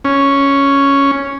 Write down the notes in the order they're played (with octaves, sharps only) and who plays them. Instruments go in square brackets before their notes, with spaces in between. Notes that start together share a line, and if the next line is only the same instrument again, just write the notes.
[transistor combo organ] C#4